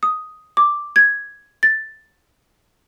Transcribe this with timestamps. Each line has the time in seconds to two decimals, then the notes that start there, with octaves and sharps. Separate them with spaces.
0.03 D#6
0.57 D6
0.96 G#6
1.63 A6